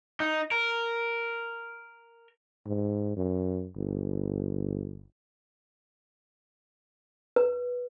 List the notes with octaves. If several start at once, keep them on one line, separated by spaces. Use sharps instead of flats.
D#4
A#4
G#2
F#2
G1
B4